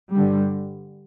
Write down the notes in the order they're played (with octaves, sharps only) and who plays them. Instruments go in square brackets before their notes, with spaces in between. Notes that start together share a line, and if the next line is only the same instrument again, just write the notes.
[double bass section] G2 D3 G3